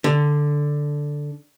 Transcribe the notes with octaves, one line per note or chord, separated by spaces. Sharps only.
D3